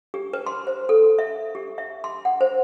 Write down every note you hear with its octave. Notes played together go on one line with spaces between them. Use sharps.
G4
B4
C6
C5
A4
E5
G4
E5
C6
F#5
C5